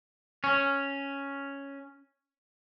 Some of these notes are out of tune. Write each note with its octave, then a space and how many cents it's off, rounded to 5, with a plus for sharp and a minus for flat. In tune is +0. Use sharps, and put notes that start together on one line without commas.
C#4 +0